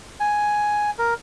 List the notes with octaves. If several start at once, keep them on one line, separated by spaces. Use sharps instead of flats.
G#5
A#4